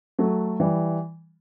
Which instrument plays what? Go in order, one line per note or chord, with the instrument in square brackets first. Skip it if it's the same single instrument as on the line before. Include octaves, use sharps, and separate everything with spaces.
[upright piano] F#3 A3
E3 G3